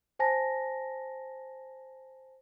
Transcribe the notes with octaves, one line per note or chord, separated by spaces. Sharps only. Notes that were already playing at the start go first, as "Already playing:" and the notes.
C5 G#5 A5 A#6